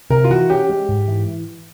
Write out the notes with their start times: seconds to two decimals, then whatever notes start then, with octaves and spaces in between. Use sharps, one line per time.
0.10 C3 A#4
0.24 F4
0.30 E3 F#4
0.50 C#4 G4
0.70 G#3
0.89 G#2
1.08 E3